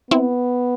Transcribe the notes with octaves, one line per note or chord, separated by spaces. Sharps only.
B3 C4 E4